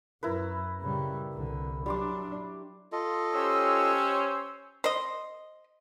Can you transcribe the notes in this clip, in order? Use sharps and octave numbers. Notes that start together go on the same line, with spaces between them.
F#2 E4 A#4 B4
C#3 G3
C2 D3
F#3 G3 D4 C6 D6
F4 A4 D#5
C#4 G4 C5 C#5 C6 E6
C5 D#5